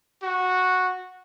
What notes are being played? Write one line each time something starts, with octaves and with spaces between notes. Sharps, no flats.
F#4